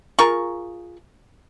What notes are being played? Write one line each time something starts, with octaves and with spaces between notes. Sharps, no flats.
F4 G#4 A#4 C#6